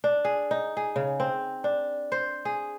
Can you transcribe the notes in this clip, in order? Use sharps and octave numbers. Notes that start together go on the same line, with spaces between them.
D4
G#4
D#4
G#4
C#3
C4
D4
C5
G#4